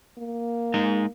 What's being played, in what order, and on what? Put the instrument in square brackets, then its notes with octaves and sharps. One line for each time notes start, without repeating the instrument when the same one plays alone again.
[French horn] A#3
[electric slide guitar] G#3 D#4 A#5